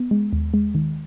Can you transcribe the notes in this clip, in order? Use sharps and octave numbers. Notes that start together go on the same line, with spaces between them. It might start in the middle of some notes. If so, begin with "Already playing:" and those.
Already playing: B3
G#3
D#2
G#3
D#3